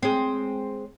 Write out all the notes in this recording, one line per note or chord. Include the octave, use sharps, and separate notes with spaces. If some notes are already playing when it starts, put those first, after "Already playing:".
G#3 C4